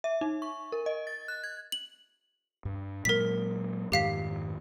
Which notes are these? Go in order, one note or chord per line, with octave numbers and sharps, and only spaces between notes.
E5
D#4
C#6
A#4
D#5
A6
F#6
G#6
F#7
G2
A#2 F#3 G#3 A#4 B6
F2 G#2 D#3 G4 F5 B6